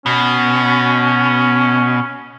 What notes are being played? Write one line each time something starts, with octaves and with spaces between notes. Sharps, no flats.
B2 C#4